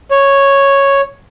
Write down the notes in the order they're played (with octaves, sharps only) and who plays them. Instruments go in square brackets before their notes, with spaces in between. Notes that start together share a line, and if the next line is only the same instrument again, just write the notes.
[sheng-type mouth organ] C#5